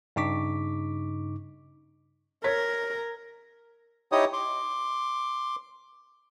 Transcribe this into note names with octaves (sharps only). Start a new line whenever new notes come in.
G2 C#3 D#4 C#6 D6 B6
A#4 C#5 G#6 B6
D#4 E4 G4 C#5 D#5 D#6
C6 D6